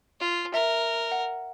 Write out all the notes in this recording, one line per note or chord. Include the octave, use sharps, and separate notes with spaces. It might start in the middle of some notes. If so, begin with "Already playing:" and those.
F4
A#4 E5
F#5